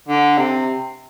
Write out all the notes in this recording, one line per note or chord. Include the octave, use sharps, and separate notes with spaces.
D3
C3